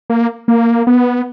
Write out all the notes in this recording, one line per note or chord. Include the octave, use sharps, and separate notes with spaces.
A#3
A#3
B3